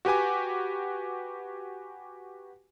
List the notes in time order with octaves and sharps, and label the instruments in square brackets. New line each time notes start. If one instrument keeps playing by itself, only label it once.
[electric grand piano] F#4 G4 B4 G#5 D6